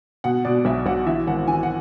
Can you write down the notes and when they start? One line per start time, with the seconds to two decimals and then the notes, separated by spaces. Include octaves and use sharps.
0.24 B2 F#5
0.45 B2 D5
0.65 B1 E5
0.86 B1 F#5
1.06 E3 E5
1.27 G#1 F#5
1.47 E3 G#5
1.63 F#5